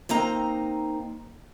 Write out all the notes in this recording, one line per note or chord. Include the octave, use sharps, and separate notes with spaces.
A#3 C4 D#4 A#5